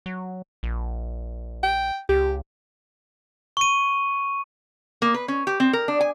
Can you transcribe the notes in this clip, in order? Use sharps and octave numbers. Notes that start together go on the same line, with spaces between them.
F#3
A#1
G5
C#2 G4
C#6 D#7
A#3
B4
C#4
G4
C4
A#4
D4
G#5